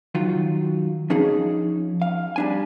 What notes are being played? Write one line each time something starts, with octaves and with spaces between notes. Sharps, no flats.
D#3 F#3 F4
F3 C#4 D#4 G#4
F5
G3 D4 G#5